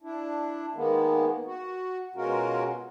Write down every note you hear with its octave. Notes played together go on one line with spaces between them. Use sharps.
D4 E4
D#3 G#3 A#3 B3
F#4
B2 G#3 C#4 F4 F#4 A#4